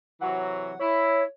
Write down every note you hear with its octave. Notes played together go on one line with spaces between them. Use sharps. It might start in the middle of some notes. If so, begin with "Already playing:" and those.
C3 E3 F#3 F#5
E4 C#5